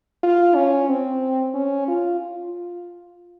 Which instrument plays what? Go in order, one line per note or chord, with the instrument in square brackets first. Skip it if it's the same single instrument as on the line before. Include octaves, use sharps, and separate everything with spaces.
[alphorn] F4
C#4
C4
C#4
F4
F4